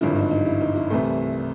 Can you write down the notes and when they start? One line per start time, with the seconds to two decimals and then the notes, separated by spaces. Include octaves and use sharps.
0.01 G#1 G2 D3 F3 E4
0.16 D#4
0.31 D#4
0.46 E4
0.61 D#4
0.75 E4
0.90 C2 C3 E3 A3